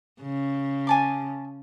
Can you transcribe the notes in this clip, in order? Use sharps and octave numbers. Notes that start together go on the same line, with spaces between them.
C#3
G#5 A5 D6